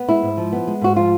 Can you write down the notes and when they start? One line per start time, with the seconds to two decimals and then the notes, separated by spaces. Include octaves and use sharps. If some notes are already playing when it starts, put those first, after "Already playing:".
Already playing: B3
0.08 G#3 E4
0.22 G#2
0.37 F3
0.52 B3
0.67 G#3
0.81 G#2 F#4
0.96 F3 F4